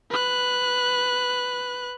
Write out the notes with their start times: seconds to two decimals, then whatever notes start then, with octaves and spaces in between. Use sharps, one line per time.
0.10 B4 F#6